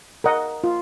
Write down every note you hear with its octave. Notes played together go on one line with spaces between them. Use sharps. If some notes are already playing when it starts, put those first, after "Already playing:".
A#4 D#5 F#5
F4